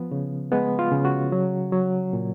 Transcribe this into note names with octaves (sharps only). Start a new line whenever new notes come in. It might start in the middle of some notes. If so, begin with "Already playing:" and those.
Already playing: F3 B3
C#3
G#3 B3
F4
C#3
F#4
F#3
F#3
A#2